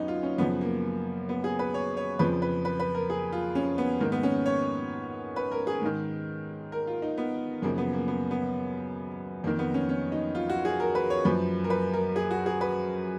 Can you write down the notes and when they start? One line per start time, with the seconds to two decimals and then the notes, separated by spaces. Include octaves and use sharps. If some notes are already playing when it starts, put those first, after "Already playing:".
Already playing: F#2 B3 C#4 D#4
0.08 F4
0.23 C#4
0.38 F#2 C#3 F3 B3
0.61 A#3
1.29 B3
1.44 G#4
1.59 B4
1.74 C#5
1.97 C#5
2.19 F2 C#3 F3 B4
2.42 B4
2.65 B4
2.80 B4
2.95 A#4
3.10 G#4
3.32 F4
3.55 C#4
3.78 B3
4.00 G#2 D#3 A#3
4.12 B3
4.23 C#4
4.46 C#5
5.36 B4
5.52 A#4
5.67 G#4
5.82 G#2 D#3
6.72 A#4
6.87 F4
7.02 D#4
7.18 B3
7.62 F#2 C#3 F3 A#3
7.78 B3
7.93 A#3
8.08 B3
8.31 B3
9.44 F2 A#3
9.47 D#3
9.59 B3
9.74 C#4
9.89 C#4
10.12 D#4
10.35 F4
10.49 F#4
10.65 G#4
10.80 A#4
10.95 B4
11.10 C#5
11.25 F#2 F3 B4
11.64 A#4
11.70 B4
11.94 A#4
12.16 G#4
12.31 F#4
12.46 G#4
12.61 B4